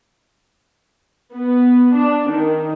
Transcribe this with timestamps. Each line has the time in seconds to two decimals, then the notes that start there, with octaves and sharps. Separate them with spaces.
1.34 B3
1.95 D4
2.30 D#3